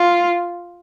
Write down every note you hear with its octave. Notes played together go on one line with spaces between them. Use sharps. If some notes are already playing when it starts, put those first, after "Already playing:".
Already playing: F4